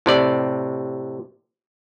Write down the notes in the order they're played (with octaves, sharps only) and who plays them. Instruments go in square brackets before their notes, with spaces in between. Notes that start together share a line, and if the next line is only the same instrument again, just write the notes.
[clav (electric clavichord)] A2 C3 D5